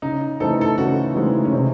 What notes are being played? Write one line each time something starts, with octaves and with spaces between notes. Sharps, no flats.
C#3 D#4
E3 A3 C4 D#4 A4
A4
C#3 F#4
E3 G#3 A3 C4 D#4
C#4
C3 C4